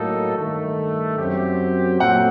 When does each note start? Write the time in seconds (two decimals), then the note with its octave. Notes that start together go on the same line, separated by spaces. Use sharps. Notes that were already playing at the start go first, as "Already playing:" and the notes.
Already playing: A2 F#3 A#3 D#4 A4
0.36 G2 D#3 A3
1.18 F#2 F#3 C4 G4
2.00 A#2 F#3 A3 C4 F#5